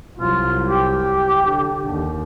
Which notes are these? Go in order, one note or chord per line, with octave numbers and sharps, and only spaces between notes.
C2 F#3 F4
G4
D3
D#2